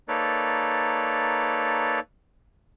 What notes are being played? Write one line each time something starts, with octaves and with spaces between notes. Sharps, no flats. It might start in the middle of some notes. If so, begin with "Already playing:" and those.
A#3 D#4 A4 B4 C#5 D5